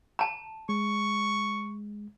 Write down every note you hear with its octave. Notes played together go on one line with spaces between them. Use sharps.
A5 A#5
G#3 C#6